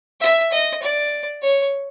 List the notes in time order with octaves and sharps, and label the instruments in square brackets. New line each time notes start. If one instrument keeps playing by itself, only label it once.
[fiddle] E5
D#5
D5
C#5